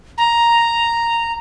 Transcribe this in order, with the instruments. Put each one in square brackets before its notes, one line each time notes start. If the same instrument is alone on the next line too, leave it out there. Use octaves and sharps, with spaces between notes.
[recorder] A#5